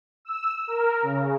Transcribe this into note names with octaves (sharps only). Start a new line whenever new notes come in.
E6
A#4
C#3